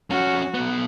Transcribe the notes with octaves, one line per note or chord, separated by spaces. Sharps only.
F2 C#4 F#4
B1 B3